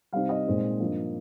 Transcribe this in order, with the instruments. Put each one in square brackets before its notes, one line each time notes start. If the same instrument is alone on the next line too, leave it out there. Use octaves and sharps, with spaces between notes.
[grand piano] C3 G3 C4 D#4 F5
D#5
A#2 G#3 C4 D#4
G2 F3 A#3